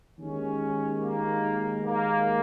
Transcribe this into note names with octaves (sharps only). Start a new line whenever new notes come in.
D#2 D#3 G#3 C#4
A#3
A#3